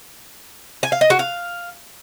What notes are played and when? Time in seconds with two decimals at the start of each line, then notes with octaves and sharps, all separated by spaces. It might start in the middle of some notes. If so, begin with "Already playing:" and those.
0.83 G#5
0.92 F5
1.01 D#5
1.10 F#4
1.19 F5